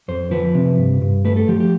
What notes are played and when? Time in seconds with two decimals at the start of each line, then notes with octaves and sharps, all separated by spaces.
0.08 F2 C5
0.31 F3 B4
0.55 C3
0.78 G2
1.02 G2
1.25 A3 B4
1.36 A4
1.48 F3 G4
1.60 G4